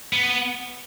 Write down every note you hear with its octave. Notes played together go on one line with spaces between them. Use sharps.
B3